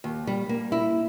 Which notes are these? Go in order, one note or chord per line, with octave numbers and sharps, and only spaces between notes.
D#2
G3
A#3
E4